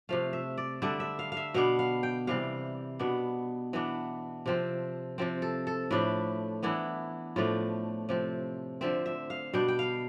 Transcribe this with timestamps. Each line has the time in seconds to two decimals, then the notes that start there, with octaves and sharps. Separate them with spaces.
0.09 C3 F3 A3 F5
0.33 E5
0.58 D5
0.82 D3 G3 D4 E5
1.00 E5
1.19 F5
1.32 F5
1.37 E5
1.54 B2 B3 D4 F5
1.79 F5
2.03 G5
2.27 C3 E3 G3 F5
2.99 B2 B3 D4
3.73 E3 B3 D4
4.46 C3 F3 C4
5.18 C3 F3 C4
5.42 A4
5.67 A4
5.91 A2 F3 A3 D4 B4
6.63 E3 B3 D4 E4
7.36 A2 F3 A3 D4 F4
8.09 C3 F3 C4
8.81 D3 F3 C4 E5
9.06 E5
9.30 F5
9.53 B2 G3 D4 G5
9.68 G5
9.79 F5